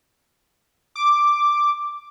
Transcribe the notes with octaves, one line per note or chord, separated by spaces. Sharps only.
D6